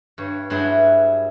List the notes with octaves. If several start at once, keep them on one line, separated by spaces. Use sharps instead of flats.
G2 C#5
G2 F#3 E4 G#4 C6